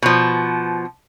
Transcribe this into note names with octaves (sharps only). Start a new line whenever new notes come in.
B2 F3